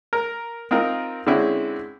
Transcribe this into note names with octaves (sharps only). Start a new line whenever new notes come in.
A#4
C4 D#4 F4 A#4
D3 G#3 C4 C#4 E4